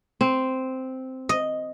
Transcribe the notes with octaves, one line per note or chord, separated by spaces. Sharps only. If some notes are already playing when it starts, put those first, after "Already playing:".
C4
D#5